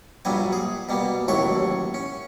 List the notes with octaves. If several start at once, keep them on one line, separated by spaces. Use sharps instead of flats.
A#1 G2 A#2 F#3 G3 G#5
G#4
B2 G3 A#3
A1 D#2 A2 F#3 C#5 C#6
C#4